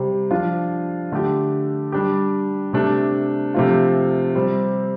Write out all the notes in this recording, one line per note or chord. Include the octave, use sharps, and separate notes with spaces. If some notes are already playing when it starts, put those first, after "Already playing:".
Already playing: C3 G3 C4
F3 D4 F4
D3 A3 D4 G4
G3 D4 G4
C3 A3 D4
C3 F3 A3 C4 F4
C3 G3 C4